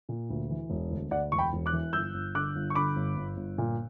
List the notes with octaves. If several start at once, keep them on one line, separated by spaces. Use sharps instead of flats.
A#2
D2
E3
E1
D2
D2 D5 F#5
E1 C#6
G5 B5
E1
D6 F#6
E3
G1 E6 G6
G1
D3 D6 F#6
G1
C#6
D3 B5 D6
G1
G1
G1
A#2